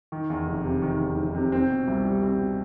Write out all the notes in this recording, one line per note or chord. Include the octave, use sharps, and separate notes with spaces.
D#3
E2
F1
C3
D#3
E2
F1
C3
C4
B2
C2
G3
C4
B2